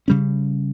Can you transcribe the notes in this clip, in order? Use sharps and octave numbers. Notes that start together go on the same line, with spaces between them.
C#3 G3 C#4